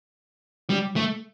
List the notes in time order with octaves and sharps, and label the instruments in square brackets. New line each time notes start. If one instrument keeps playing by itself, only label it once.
[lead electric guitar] G3
A3